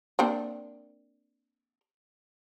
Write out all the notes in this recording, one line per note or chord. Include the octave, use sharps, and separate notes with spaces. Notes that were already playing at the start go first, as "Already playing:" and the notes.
A#3 C4 D4